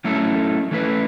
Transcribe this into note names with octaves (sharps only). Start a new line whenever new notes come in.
F#3 A3 C#4 E4 A4
E3 A3 C#4 E4 B4